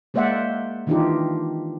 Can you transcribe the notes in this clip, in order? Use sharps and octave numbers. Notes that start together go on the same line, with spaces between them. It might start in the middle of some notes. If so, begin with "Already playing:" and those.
G#3 A#3 C5 D5 E5 F#5
D#3 E3 D4 D#4 F4 G4